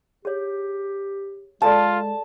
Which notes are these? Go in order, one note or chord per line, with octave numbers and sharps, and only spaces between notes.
G4 G#4 C#5
G#3 F4 G#4 A4 D5 A5